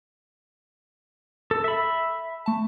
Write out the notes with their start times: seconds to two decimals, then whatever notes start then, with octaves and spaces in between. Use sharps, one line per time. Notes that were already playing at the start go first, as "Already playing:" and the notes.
1.51 A4
1.64 E5 B5
2.46 A3 A5